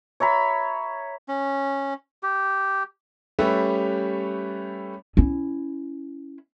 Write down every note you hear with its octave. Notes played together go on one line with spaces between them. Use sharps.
C#5 E5 A#5 B5
C#4
G4
G3 A3 C#4 G4 B4 E5
C#4 E4